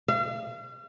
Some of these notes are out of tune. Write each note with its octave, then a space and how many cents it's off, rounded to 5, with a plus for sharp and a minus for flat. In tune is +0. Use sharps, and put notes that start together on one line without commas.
F5 -40